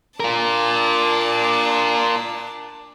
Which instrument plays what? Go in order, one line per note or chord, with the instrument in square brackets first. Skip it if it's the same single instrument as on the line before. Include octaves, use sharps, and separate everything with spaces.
[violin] D4 A5 [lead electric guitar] F4 A#4